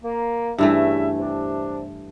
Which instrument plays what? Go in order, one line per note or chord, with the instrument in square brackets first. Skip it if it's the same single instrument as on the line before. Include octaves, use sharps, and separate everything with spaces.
[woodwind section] A#3
[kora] G2 E3 A3 [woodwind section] C#3 G3 E5
[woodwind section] C3 D4